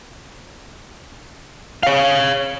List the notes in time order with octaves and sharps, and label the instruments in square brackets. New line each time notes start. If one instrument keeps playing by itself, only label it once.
[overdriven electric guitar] C#5 F5